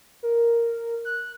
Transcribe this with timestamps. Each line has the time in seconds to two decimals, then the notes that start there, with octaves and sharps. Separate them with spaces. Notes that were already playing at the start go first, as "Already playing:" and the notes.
0.23 A#4
1.05 F#6